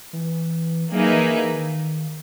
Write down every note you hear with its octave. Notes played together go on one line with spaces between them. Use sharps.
E3
F#3 A#3 D#4 G#4 B4 E5
E3
E3
D#3